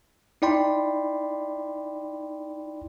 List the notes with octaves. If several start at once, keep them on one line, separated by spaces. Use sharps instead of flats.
D#4 E4 D5 G5 B5 C6